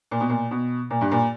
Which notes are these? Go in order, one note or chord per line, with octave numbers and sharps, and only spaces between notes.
A#2
B2
A#2
B2
A#2
G2
A#2